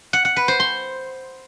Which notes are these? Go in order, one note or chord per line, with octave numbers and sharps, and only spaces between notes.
F#5
F#5
B4
C5
C6